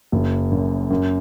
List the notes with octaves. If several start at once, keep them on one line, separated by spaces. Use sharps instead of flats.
F#1
F#2
F#2